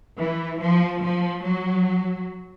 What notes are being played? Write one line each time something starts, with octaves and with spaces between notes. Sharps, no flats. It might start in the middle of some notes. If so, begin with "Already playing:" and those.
E3
F3
F3
F#3